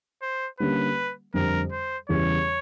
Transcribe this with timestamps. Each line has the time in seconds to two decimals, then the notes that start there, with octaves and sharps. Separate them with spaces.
0.22 C5
0.60 D3 G3 A#3 C#4 B4
1.34 F2 D3 G3 A#4
1.72 C5
2.09 E2 C#3 E3 G3 C#5